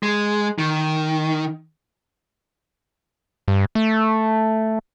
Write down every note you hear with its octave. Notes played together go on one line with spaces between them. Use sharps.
G#3
D#3
G2
A3